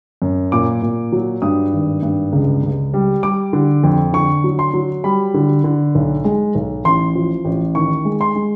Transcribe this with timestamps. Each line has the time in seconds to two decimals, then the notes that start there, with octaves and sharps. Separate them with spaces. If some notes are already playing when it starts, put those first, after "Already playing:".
0.22 F#2
0.52 A#2 D6
0.82 A#2
1.12 F#3
1.42 G2 D#6
1.73 G#1
2.03 G2
2.33 C#2
2.63 C#2
2.94 G3
3.23 G3 D6
3.53 D3
3.83 F2
4.13 D3 C#6
4.44 F#3
4.59 C6
4.74 F#3
5.04 G3 B5
5.34 D3
5.64 D3
5.95 B1
6.24 G#3
6.55 B1
6.85 A1 C6
7.15 F3
7.45 A1
7.75 D#3 C#6
8.05 G#3
8.21 C6
8.35 G#3